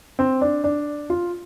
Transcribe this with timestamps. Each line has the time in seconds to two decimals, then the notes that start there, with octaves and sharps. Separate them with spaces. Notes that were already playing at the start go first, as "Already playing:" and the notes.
0.19 C4
0.41 D4
0.64 D4
1.10 F4